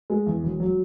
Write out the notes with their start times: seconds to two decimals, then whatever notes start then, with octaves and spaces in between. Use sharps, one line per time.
0.10 G#3
0.27 E2
0.44 E1
0.60 F#3